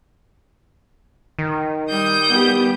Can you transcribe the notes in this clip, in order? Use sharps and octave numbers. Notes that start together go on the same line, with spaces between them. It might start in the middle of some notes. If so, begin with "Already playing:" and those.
D#3
G3 D#6 G6
B3 G4